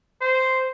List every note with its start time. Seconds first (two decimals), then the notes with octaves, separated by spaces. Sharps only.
0.21 C5